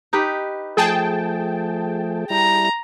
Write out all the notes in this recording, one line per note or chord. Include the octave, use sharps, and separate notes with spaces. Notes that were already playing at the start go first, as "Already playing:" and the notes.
D#4 G4 B4
F3 A3 G#4 G5 A5
G3 E4 A#5